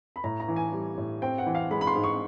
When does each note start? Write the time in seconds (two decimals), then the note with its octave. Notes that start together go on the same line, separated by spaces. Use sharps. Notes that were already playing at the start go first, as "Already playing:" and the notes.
0.16 B5
0.24 A2 A#5
0.40 A#5
0.48 E3
0.56 G#5
0.72 G3
0.97 A2
1.22 C4 G5
1.38 F#5
1.46 E3
1.55 F5
1.71 G#3 B5
1.81 B5
1.87 C6
1.96 G#2
2.04 C#6